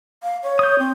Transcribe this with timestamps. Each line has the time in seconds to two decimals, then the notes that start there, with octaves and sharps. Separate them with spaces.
0.23 F5
0.43 C#5
0.59 D#6 G6
0.79 C4